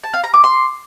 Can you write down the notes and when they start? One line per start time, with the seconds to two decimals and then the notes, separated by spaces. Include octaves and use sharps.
0.04 A5
0.14 F5
0.24 A#5
0.34 D6
0.44 C6